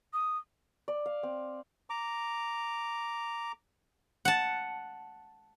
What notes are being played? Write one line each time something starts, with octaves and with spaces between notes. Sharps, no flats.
D#6
D5
F5
C4
A#5 D6
F#5 A5